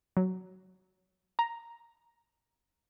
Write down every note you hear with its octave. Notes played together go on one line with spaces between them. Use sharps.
F#3
A#5